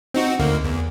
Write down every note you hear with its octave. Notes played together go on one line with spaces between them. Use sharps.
C4 D#4 F#4
D2 A#3
E2